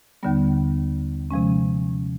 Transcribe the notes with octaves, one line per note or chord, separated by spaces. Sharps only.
D#2 D3 G3 B3
C3 F3 G#3 C#4